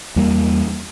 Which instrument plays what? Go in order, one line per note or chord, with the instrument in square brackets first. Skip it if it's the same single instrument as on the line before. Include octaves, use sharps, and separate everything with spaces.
[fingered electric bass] E2 G3 A#3